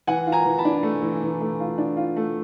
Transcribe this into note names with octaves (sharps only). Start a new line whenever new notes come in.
E3 F#5 G#5
F4
G#5 A#5
E3
A5 B5
D4
A3
E3
E3
A3
F4
D4
F4
A3